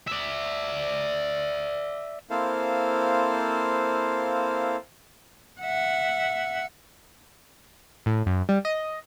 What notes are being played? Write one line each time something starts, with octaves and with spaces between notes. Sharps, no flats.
D5 E5
A#3 C4 E4 A4 C5 F5
E5 F#5
A2
F#2
G3
D#5